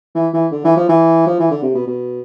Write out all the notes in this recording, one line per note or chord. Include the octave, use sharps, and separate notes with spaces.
E3
E3
D3
E3
F3
E3
F3
E3
D3
C3
B2
B2